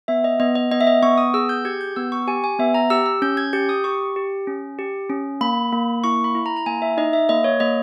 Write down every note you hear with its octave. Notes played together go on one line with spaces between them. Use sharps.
B3 E5
D#5
B3 D#5
D#5
B3 D#5
E5
D#5
B3 C#6
D#6
G#4 E6
G6
G4 G#6
G6
B3 E6
C#6
G4 G#5
G#5
B3 E5
A#5
G4 E6
E6
C#4 G6
G#6
G4 G6
D#6
G4 C#6
G4
C#4
G4
C#4
A#3 B5
A#3
E4 C#6
B5
E4
A#5
A#5
A#3 G#5
E5
D#4 D#5
E5
A#3 D#5
C#5
A#3 D#5